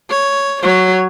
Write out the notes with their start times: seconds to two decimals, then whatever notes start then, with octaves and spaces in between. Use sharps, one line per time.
0.10 C#5
0.62 F#3 C#5